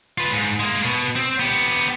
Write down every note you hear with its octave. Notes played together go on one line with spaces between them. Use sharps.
F4 B4
G#2
G#3 A#3
B2
C4
B3 G4